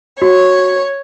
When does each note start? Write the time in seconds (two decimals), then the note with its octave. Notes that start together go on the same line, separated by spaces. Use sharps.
0.22 F#4 C#5